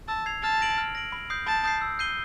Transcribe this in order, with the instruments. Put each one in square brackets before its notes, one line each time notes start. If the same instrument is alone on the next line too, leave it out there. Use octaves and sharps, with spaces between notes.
[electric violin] A5 [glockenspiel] E6
[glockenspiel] G#6 C7 F7
[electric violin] A5 [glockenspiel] F6
[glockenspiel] A#6 D7 F#7
F6
A#6 D7 F#7
B5
D#6 G6 C7
[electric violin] A5 [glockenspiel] B5
[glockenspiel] D#6 G6 C7
E6
G6 C7 D#7 G7